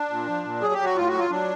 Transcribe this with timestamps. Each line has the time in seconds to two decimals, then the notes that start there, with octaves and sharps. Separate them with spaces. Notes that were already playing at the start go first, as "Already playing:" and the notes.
Already playing: D4
0.09 A#2
0.27 F3
0.44 A#2
0.61 F#3 G#4
0.73 F#3 G4
0.85 F#4
0.96 A2 F4
1.08 F#4
1.13 F#3
1.19 F4
1.30 F#3 D4